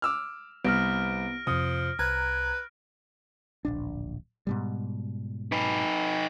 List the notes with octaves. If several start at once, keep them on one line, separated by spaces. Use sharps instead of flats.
D6 E6 F6
C2 B3 F6 A#6 D7
F2 C3 F3 D#6
C2 B4 A#5 G#6
D1 A#1 D4
G#2 B2 G3
D#4 B4